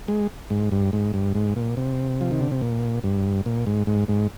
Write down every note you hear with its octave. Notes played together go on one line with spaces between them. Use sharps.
G#3
G#2
G2
G#2
G2
G#2
A#2
C3
F3
D#3
D3
C3
A#2
G2
A#2
G#2
G#2
G#2